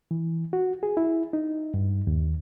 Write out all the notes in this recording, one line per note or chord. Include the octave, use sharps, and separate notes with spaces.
E3
F#4
G#4
E4
D#4
G2
D#2